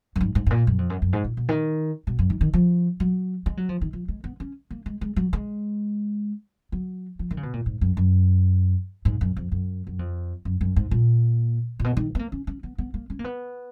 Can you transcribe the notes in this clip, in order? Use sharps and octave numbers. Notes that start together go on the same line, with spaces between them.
F#2
G#2
G#2
G#2
A#2
F#2
F2
F#2
F#2
G#2
A#2
B2
D#3
B2
F#2
D#3
D#3
F3
F#3
G#3
F#3
F3
D#3
F3
G#3
B3
C#4
A#3
G#3
G#3
F#3
G#3
F#3
F3
D#3
C#3
B2
A#2
G#2
F#2
F#2
G#2
F#2
F2
F#2
F#2
F2
F#2
F#2
G#2
A#2
A#2
B2
D#3
B3
A#3
C#4
C#4
B3
B3
A#3
C#4
A#3
B3